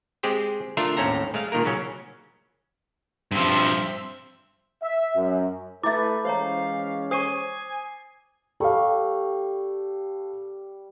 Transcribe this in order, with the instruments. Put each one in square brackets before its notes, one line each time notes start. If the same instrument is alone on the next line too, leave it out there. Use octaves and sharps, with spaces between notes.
[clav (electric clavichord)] G#3 C4 G4 G#4 C5
A3 D4 F4 A#4 E5
D#2 A2 C4 C#4 A4 A#5
G#3 A3 F5
A#2 D#3 A#3 A#4
C#3 F#3 C#4
[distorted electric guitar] G2 F3 [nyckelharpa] C4 E5
[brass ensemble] E5
F#2
[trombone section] A3 A4 B4 [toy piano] E4 E5 [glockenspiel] D6 G6 A6
[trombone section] E3 G#3 C#4 [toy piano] C5 C#5 A#5 [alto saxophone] F5
[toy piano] C5 C#6 [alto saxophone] G#5 [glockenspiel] D#6 C7 D#7
[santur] G3 C#6 [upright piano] A4 F5